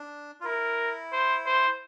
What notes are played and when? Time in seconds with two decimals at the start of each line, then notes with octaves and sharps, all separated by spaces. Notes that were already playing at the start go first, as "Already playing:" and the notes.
Already playing: D4
0.40 F4
0.44 E4 A#4
1.12 C5
1.46 C5